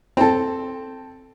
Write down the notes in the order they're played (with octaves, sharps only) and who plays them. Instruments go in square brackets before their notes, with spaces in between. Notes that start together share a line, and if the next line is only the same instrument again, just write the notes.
[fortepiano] C4 A4